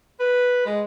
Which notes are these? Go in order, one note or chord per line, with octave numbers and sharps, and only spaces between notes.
B4
G#3